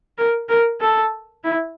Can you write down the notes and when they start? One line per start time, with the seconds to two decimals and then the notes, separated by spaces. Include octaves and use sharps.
0.18 A#4
0.49 A#4
0.81 A4
1.44 E4